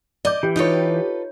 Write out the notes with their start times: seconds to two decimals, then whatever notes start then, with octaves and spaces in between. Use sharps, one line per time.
0.25 D5 D#5 D6 G6
0.43 E3 G4
0.56 D#4 F4 A4 B4 C#5